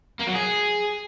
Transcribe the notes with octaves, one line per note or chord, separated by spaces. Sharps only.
A#3
F#3
G#4